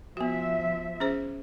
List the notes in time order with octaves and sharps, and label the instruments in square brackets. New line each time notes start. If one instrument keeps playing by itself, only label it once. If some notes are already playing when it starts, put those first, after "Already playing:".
[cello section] F3 E5 [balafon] B3 F#4
[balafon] C#4 G#4 C5